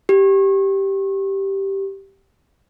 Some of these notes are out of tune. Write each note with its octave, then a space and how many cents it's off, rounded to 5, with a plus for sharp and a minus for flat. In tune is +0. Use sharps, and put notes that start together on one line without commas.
G4 -5